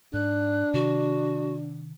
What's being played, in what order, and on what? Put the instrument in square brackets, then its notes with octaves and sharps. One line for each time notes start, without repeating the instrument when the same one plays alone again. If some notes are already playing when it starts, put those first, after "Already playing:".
[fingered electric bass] G#2 [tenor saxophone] D4 [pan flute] F#6
[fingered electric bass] C3 D#3 [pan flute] F#4